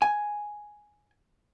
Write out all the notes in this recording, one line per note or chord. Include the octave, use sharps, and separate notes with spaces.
G#5